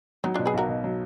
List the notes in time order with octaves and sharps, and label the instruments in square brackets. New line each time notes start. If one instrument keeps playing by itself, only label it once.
[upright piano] F#3 [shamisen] B3 D#4
[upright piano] B2 [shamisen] D4 F4
[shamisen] G#4 B4
[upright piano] B1 [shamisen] F#4 A#4
[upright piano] B2
F#3